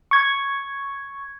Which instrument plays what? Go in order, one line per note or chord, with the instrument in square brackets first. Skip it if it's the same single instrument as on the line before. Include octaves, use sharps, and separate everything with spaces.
[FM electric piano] C#6 G#6